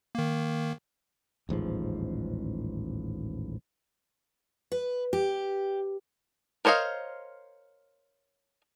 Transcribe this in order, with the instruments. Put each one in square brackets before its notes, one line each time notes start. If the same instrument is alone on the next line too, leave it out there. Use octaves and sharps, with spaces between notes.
[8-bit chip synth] D#3 A#3
[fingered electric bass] D#1 A1 G#2 F3
[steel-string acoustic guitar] B4
G4
[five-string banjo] A#4 C5 C#5 D#5 F5